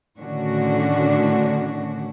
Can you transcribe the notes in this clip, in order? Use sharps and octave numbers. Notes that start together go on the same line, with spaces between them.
A2 D3 D#3 C#4 D4 F#4